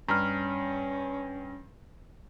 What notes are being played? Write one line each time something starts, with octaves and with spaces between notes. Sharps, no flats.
G2 C#4 A#5 F6